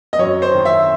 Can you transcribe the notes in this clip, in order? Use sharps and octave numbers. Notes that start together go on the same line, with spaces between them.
D#5
F#2 C#5
C5
D#3
E5